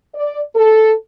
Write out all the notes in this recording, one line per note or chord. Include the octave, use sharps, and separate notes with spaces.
D5
A4